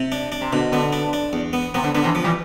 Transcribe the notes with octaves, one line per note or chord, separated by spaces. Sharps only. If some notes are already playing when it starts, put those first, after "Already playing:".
Already playing: C3
D4
D4
C3
B2 D3
D3 B3
D4
D4
E2
B3
C3 B3
D3
D3 B3
C3 E3
F3
E3 G3